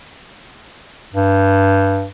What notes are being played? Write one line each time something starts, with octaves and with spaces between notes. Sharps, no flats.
G2